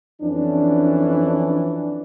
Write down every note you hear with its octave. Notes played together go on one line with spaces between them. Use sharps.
F2 E3 C#4 D4